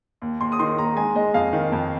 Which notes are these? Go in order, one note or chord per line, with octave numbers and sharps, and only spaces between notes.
D#2
D#2 C6
D#6
D#3 C6
D#2 A#5
G#3 G#5
G#3 D#5
F2 F5
D#3
F2